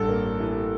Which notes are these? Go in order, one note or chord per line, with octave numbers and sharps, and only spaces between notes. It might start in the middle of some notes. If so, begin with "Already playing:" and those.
Already playing: A1 G2 A4
A#3
E3